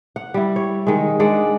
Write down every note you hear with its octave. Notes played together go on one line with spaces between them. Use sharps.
F#5
G3 E4
C#5
D#3 G#3
G#3 D4 D5 F#5